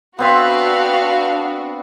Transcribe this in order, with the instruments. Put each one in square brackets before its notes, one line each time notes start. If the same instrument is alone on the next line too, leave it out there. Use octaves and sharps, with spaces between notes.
[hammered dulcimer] B3 C4 E5 [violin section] D4 F#4 [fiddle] B4 F5